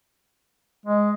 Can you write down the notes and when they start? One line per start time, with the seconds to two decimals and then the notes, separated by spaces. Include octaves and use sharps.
0.86 G#3